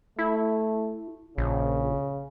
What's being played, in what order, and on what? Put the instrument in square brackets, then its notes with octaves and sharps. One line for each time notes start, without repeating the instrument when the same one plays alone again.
[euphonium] A3 [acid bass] E4
[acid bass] A#1 [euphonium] C#3